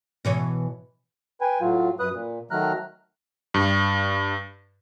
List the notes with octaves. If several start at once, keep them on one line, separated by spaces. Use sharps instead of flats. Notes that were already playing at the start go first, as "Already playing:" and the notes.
B2 E3 C#5
B4 G5 G#5
A2 F#3 F4
F#2 B4 D#6 F#6
A#2
D#3 F#3 A3 A#5 F6 F#6
G2